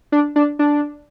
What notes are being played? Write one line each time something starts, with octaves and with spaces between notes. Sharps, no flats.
D4
D4
D4